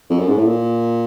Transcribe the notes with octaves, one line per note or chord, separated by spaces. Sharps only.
F2
F#2
G#2
A2
A#2